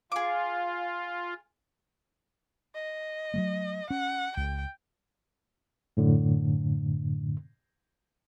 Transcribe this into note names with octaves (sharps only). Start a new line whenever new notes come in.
F4 G#4 F5 D6
D#5
F#3 G3 A3
C#4 F#5
C#2 G5
F#2 A2 D3